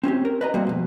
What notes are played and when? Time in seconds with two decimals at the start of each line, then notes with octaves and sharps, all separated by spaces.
0.04 C4 C#4 F4 G4
0.25 A#4
0.41 B4 D#5 A#5
0.54 G3 A#3 C4 F#4
0.67 F2 B2